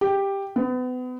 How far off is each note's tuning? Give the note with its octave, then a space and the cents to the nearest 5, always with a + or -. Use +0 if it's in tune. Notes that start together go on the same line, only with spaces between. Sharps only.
G4 +5
B3 +35